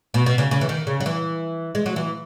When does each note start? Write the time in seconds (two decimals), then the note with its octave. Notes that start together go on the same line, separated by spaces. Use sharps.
0.14 B2
0.26 B2
0.38 C#3
0.51 C#3
0.61 E3
0.69 D#3
0.87 C#3
1.00 F#3
1.06 E3
1.75 G#3
1.86 F#3
1.96 E3